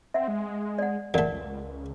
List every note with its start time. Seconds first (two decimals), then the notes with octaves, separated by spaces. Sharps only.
0.14 C4 E5 F#5
0.28 G#3
0.78 D5 F#5
1.14 E1 F2 A3 A#4 D5 F#5
1.32 C#2